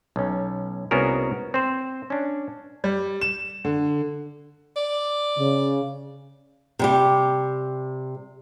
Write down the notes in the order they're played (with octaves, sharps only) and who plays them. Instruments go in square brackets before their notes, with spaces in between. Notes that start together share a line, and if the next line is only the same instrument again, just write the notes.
[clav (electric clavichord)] B1 C#4
C2 B3 C#4 F#4 G#4 A#4
C4 C5
C#4 D4
[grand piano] G3
E7
D3
[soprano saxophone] D5
[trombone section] C#3
[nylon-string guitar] C3 G3 G4